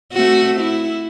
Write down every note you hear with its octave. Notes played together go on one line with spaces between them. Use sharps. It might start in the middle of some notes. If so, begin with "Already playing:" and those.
A3 C4 F#4
E4